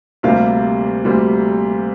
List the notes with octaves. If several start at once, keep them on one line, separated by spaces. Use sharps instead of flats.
D2 C3 G3 A#3 F5
D2 C3 G3 A#3